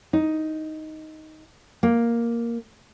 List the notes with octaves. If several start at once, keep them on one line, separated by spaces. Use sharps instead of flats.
D#4
A#3